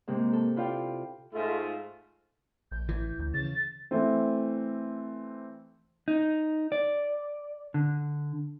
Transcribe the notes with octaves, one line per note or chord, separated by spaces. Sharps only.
G#2 C3 A#3
A4
E4 F4 D5 F5 G5
G#2 A3 F4
A#1 G6
A1 E3
D2
C#3 A6
E3 A3 C4
D#4
D5
D3